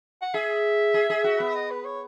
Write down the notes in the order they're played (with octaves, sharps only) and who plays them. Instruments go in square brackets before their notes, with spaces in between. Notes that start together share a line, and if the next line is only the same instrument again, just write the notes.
[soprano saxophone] F#5
[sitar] G#4 [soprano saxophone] E5
[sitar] G#4
G#4
F#4
B3
[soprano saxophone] D#5
B4
C#5